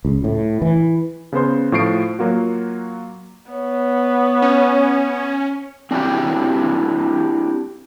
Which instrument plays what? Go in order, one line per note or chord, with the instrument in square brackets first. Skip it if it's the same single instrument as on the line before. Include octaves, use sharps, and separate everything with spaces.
[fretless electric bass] C#2
A2
E3
[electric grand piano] C#3 B3 C5 C6
A2 F3 C#6 C7 D7
F#3 A#3 F4 F#4
[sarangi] B3 [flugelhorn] C#5
[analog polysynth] C#4
[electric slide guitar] C4 D4 E4 F#4 G4